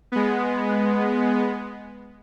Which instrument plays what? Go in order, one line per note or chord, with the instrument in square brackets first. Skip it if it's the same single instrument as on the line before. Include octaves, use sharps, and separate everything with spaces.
[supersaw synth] G#3 B3